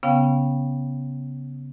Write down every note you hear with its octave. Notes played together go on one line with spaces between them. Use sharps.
C#3 B3 C#4 F5 G5